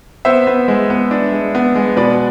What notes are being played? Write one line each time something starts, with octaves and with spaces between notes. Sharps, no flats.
B3 C5 E5
B3
G#3
B3
D4
G#3
B3
G#3
B2 B4 D5